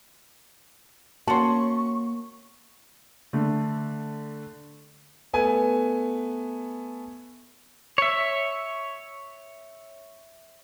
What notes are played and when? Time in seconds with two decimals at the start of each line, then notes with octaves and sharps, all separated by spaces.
1.28 A#3 C#4 F#4 A5 C6 C#6
3.33 D3 A3
5.33 A3 B3 G#5
7.98 C#5 E5